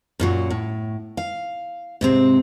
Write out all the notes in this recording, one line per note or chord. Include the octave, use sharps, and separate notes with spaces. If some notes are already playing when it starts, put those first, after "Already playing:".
F#2 A#2 F#3
A2
F5
G#2 C3 C4